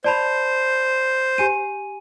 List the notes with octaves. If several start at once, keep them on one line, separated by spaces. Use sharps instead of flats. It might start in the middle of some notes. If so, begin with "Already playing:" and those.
C5 D5 A5 B5
G4 G#5 D#7